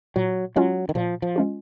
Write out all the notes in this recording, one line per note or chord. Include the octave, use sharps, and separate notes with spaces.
A#2 F#3
F#3 G#3 C#4 F4
D#3
A#2 F3
F3
G#3 C#4 F4